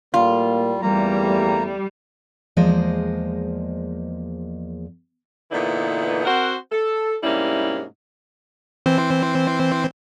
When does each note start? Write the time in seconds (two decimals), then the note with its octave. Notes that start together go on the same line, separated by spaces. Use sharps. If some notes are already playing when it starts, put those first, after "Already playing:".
0.14 A2 G3 A#3 F4
0.82 E2 G3 A3 A#3 A#5
2.57 E2 F3 G#3 A#3 C5 D#5
5.52 A#2 D3 E3 B3 D#4 E4
6.26 C4 F#4 A#4 C5 F#5
6.72 A4
7.24 G#2 C3 G3 A#3 C#4 E4
8.86 E3 C4 C5